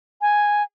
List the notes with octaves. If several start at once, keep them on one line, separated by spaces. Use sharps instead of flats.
G#5